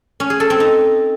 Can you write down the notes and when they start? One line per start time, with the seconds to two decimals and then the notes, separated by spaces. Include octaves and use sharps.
0.20 C#4
0.30 G#4
0.40 A4
0.50 C4
0.60 D#4